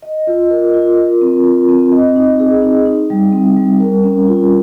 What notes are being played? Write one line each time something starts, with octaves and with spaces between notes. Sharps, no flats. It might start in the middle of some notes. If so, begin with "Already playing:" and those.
D#5
F4
A#4
F4
A#4
C4
F4
C4
D#5
D#4
G#4
D#4
D#4
G3
C4
G3
A#4
C#4
F4